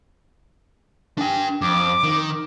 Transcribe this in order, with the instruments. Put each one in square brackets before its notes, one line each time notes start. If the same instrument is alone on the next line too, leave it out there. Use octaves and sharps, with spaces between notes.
[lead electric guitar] D4 G5 [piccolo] G#5
[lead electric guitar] F2 [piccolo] D6
[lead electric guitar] D#3